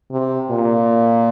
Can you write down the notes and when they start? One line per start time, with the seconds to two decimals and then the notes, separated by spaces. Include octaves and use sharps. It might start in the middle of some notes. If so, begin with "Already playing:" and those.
0.11 C3
0.50 A#2